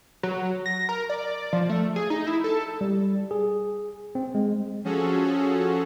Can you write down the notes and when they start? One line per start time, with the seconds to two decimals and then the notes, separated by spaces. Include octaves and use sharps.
0.23 F#3
0.66 A#6
0.89 A#4
1.09 D5
1.53 F3
1.69 A3
1.96 G#4
2.10 D#4
2.27 E4
2.44 A4
2.81 G3
3.31 G#4
4.15 C4
4.35 G#3
4.84 F3 C#4 F#4 G#4 A4